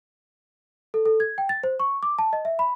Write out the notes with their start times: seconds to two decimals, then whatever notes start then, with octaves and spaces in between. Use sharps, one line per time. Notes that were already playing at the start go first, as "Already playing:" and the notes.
0.94 A4
1.06 A4
1.20 G#6
1.38 G5
1.49 A6
1.63 C5
1.80 C#6
2.03 D6
2.18 A5
2.33 D#5
2.45 E5
2.59 B5